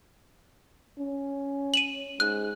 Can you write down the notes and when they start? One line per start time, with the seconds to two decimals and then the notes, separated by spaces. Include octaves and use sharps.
0.98 C#4
1.74 D#7 E7 F#7
2.20 G#2 F#6